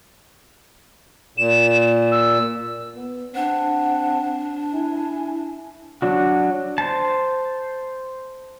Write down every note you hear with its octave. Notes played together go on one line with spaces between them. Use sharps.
A#2 E7
E6
B3
C4 D4 F#5
E4 G#5
F#3 D4 F#4
C5 A5